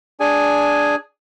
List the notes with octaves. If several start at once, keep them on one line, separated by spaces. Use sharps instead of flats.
D4 G#4 G#5